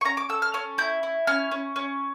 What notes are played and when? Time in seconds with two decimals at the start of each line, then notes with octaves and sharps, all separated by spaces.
0.01 C#6
0.05 C#4 A#5
0.17 D6
0.29 A4 E6
0.42 F6
0.54 C#4 F6
0.78 E4 G6
1.03 E4
1.27 C#4 F6
1.51 C#4
1.76 C#4